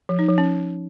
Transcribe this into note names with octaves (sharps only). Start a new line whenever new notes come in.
F3
D#4
F3
C#4